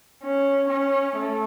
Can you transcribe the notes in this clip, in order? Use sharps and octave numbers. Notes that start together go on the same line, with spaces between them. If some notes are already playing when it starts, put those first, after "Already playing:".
C#4
C#4
A3